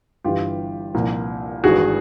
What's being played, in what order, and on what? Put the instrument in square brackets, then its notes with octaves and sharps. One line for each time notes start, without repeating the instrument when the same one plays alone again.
[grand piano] G1 G2 E3 F4 G4
C2 A#2 F3
G#1 G2 E3 F#4 G#4